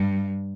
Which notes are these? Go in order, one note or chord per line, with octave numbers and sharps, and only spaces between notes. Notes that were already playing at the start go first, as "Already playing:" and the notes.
Already playing: G2